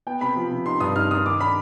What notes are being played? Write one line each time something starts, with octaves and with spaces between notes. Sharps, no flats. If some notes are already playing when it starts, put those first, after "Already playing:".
B3 G5
C3 B5
F3
C3
D#4 C6
G2 D#6
D#4 F6
D#4 D#6
D#3 D6
D4 B5